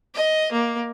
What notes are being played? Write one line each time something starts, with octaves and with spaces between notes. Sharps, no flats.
D#5
A#3